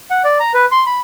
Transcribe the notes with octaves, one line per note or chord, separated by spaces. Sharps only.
F#5
D5
A#5
B4
C6
B5